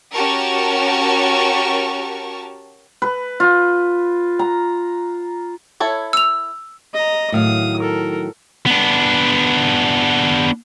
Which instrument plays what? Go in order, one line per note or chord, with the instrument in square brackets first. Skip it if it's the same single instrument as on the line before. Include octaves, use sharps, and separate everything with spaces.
[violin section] C#4 F#4 G4 A#4 A5 C#6
[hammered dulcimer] B4
F4
A#5
[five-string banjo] E4 A4 C#5
[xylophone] E6 F7
[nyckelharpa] D#5 A#5
[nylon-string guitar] A2 D#3 F#3 [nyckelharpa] F5 D#6
[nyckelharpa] A4 A#4
[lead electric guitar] B3 D4